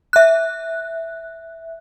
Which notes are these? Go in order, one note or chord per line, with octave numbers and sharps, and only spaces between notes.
E5 F#6